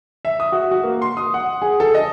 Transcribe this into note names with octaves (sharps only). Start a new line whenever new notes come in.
E5
D#6
F#4
F#4
A#3
C6
D#6
F#5
G#4
A4
D#5